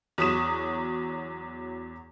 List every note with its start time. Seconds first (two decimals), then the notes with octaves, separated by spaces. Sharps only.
0.18 E2 F#3 C#6 D#6 B6 E7